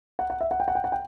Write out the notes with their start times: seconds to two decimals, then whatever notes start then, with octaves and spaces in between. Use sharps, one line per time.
0.19 F#5
0.30 F#5
0.41 E5
0.51 F#5
0.60 G5
0.68 F#5
0.75 G5
0.84 F#5
0.92 G5